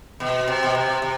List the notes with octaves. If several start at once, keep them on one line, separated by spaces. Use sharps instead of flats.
B2
C3
B2
C3
C3